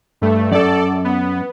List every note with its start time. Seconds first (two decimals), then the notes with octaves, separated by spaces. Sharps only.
0.21 G2 A3
0.52 F#2 A4 D5
1.05 B3